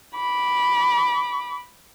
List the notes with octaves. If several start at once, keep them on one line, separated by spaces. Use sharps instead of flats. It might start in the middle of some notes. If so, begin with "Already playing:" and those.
B5 D6